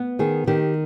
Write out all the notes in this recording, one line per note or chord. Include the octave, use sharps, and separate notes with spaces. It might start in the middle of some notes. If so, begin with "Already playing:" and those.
Already playing: B3
D#3 G#4
D#3 G4